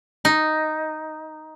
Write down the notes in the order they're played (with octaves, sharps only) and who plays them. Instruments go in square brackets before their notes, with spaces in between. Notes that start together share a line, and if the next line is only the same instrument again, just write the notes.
[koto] D#4